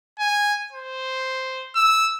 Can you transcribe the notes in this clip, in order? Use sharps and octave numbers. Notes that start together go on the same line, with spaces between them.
G#5
C5
E6